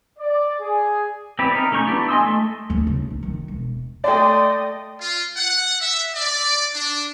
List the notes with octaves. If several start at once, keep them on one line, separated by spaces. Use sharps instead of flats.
D5
G#4
C4 E4 G4 B4 D5
D#4 A#4
A3 C#4 A#5 C#6 G6
B3 D4 E4 G4
D#5 G#5 C6 D#6 E6
A3
D2
C#3
D#4
D#3
E1
A3 D5 D#5 G5 C6
F4
F#5
E5
D5
D4